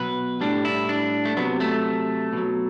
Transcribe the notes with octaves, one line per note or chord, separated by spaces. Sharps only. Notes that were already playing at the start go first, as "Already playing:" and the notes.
Already playing: B2 F#3 B4
A2 G3 D4
E4
D4
A3
C3 F#3 B3
A3
B2 F#3